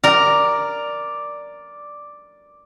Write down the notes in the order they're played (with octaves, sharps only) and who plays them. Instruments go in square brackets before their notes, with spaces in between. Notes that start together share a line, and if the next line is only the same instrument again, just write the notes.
[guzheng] A#4 A#5 [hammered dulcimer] D5